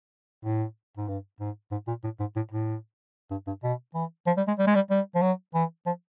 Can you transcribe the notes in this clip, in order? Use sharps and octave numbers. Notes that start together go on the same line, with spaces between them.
A2
G#2
G2
G#2
G#2
A#2
A2
G#2
A2
A2
G2
G2
B2
E3
F3
G3
G#3
G3
G#3
G3
G3
F3
F#3
E3
F3